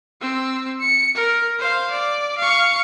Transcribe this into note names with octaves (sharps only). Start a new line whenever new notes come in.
C4 E6
C#7
A#4
C5 F5
D5
F5 C#6